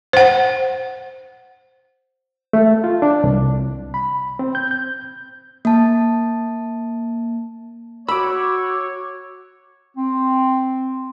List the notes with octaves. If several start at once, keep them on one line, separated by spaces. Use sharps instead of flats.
C5 F#5
A3
F4
D4
C2
B5
C4
G6
G6
A#3 A5
F#4 C#5 B5 D6 E6
C4